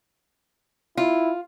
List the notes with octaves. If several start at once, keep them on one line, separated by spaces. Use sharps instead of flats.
E4 F4